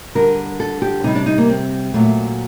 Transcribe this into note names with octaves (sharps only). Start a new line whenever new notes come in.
D3 G3 A#4
A4
G4
C3 G3 D#4
D4
D#4
A#3
C4
A#2 F#3 A3